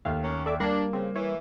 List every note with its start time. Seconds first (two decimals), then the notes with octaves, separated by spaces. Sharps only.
0.05 D#2 A3 F5
0.24 A#3 C#4
0.46 A4 D5 E5 D6
0.60 G3 A#3 D4 G#6 A#6 C7
0.93 C#3 C4
1.15 E3 C#5